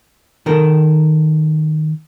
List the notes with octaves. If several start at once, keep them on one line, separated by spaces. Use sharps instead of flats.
D#3 A4 A#4